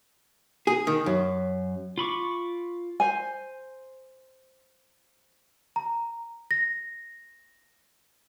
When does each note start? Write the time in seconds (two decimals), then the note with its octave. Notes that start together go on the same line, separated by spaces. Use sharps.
0.67 G#4
0.87 D#3
1.06 F#2
1.98 F4 B5 C#6 D6
3.00 C5 G#5
5.76 A#5
6.51 A#6